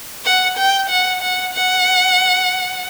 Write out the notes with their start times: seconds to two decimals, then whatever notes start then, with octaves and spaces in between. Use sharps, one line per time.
0.25 F#5
0.57 G5
0.89 F#5
1.22 F#5
1.54 F#5